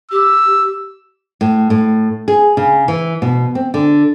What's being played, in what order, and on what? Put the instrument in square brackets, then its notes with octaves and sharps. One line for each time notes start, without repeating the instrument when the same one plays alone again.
[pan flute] G4 [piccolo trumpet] E6
[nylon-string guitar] A2
A2
G#4
C#3
E3
B2
C4
D3